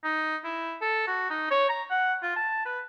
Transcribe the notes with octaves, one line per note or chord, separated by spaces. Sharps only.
D#4
E4
A4
F#4
D#4
C#5
A#5
F#5
F4
A5
B4